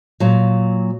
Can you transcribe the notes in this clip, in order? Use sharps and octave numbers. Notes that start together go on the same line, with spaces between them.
A#2 F#3